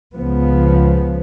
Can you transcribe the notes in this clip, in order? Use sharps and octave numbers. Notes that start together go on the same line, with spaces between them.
C#2 C#3 F3 B3